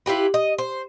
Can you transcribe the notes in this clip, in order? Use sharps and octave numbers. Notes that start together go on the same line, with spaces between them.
E4 F4 G4 B4
D#5
C5